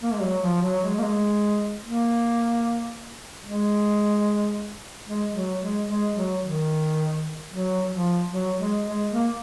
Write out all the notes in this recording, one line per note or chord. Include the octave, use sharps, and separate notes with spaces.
A#3
G#3
F#3
F3
F#3
G#3
A#3
G#3
A#3
G#3
G#3
F#3
G#3
G#3
F#3
D#3
F#3
F3
F#3
G#3
G#3
A#3